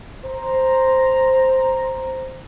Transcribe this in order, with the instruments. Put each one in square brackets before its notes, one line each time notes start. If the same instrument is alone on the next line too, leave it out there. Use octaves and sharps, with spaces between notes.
[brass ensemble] C5 A#5